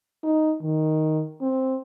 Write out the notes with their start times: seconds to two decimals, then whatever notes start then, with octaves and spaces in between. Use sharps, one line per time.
0.23 D#4
0.62 D#3
1.42 C4